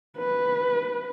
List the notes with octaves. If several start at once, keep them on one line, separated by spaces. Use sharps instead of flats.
B4